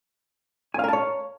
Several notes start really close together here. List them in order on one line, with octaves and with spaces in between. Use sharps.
G#5 F5 A#4 A5 C#5